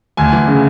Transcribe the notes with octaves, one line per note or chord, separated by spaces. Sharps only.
D2 G#5
E3
C#3